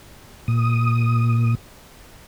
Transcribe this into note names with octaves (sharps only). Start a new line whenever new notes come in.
A#2 D#6